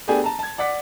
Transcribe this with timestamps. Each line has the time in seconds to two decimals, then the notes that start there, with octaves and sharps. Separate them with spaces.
0.08 A3 B3 D4 G4 G#4 G#5
0.24 A5 A#5
0.39 A5 G#6
0.58 D5 F#5 D6 B6